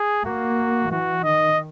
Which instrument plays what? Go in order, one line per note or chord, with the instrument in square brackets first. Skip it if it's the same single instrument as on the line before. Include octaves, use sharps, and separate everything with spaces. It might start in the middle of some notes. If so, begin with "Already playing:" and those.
Already playing: [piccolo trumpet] G#4
[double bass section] A#3 [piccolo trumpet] F#4
[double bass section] E3 [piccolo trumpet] F#4
[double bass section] D#3 [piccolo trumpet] D#5